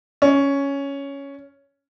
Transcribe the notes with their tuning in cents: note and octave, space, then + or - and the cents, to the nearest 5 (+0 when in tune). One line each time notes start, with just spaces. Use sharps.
C#4 +5